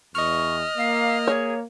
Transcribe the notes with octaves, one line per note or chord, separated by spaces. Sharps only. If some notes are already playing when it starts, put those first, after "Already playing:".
E2 D#5 C#6 F6
A#3 F5
G#4 C#5